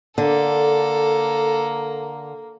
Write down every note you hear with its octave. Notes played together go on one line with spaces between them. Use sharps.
D3 A#3 A4